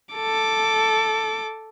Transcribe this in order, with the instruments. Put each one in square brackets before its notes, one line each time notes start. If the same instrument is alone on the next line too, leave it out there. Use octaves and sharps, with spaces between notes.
[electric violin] A4 D6